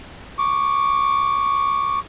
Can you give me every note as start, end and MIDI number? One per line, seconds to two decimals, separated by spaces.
0.38 1.99 85
0.38 1.99 86